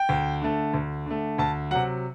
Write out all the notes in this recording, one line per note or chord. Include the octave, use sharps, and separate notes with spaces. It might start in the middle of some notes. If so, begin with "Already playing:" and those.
Already playing: G5
D2
D3 A3
D2
D3 A3
D2 A5
C3 F#3 F#5